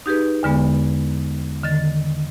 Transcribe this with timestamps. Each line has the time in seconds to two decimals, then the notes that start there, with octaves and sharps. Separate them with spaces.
0.06 D#4 G4 G#4 B4
0.43 E2 D3 G#3 B3
1.63 D3 D#3 A6